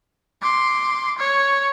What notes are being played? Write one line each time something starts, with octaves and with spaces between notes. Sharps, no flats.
C6 D6
C#5